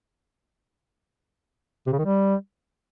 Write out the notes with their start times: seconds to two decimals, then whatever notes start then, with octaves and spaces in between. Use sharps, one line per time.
1.87 C3
1.93 C#3
1.99 D#3
2.05 G3